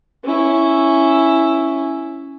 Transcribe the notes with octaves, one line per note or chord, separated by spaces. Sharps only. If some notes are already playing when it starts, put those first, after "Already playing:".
C#4 E4